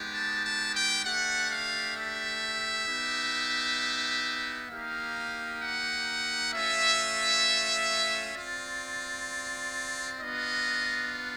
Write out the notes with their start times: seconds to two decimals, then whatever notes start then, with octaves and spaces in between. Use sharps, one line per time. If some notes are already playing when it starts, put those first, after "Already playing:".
Already playing: G#3 B3 D#4 G4
0.13 A5
0.44 A5
0.74 G5
1.04 A3 D4 G4 F#5
1.51 F5
1.96 E5
2.87 B3 D#4 G4
4.70 A#3 D#4 G4 F5
5.61 F#5
6.53 A3 C#4 F4 E5
8.35 C4 F4 D5
10.18 B3 D4 F4 D#5